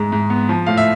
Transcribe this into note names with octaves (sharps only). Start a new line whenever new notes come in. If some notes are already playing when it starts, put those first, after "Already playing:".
Already playing: G#2 G#3
G#2
B3
F3
A2 F5
E5